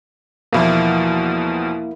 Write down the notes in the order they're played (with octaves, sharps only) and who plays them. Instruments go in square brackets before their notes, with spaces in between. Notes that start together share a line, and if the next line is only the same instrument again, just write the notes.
[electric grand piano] E2 B2 F3 [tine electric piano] A#3 E4